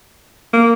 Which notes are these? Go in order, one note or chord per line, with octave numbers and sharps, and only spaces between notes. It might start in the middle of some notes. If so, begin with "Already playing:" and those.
A#3